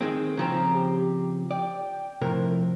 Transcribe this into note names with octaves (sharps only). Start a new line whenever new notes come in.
D#3 G#3 C4
C#3 F3 C4 A#5
G4
D5 G5
A2 C3 F3 A#4